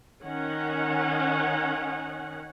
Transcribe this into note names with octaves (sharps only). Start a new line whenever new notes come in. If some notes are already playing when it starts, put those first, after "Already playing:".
D#3 C#4 F#5